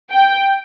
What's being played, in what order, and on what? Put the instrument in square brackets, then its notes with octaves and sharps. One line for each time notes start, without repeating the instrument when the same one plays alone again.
[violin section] G5